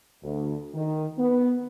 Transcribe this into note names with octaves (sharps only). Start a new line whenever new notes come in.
D2
D#3
B3